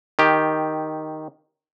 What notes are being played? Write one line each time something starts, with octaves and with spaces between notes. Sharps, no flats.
D#3 G4